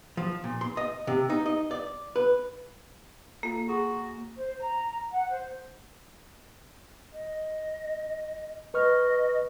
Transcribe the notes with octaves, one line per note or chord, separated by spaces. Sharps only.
F3
A#2
C6
D#5
C3
D#4
D#5
D5
B4
A#3 F4 A4
F#4 G#4 A#5 D#6
C5
A#5
F#5
C5
D#5
B4 D#5 C#6 F6